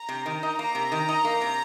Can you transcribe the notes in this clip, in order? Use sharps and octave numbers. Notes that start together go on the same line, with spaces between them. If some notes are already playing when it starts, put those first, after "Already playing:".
Already playing: A#5
C3
D#3
D#4
A#3 A#5
C3
D#3
D#4
A#3
C3